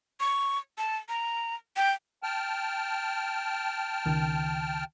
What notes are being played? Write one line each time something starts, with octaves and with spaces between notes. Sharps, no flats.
C#6
A5
A#5
G5
G5 A5 F6
C#2 D#3